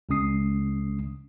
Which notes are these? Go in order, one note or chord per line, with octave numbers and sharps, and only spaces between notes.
C#2 C#3 G#3 C#4 D#6 C7